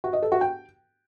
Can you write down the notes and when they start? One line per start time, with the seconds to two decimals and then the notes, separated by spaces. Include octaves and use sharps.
0.04 F#4
0.13 D#5
0.22 A4
0.32 F#4
0.41 G5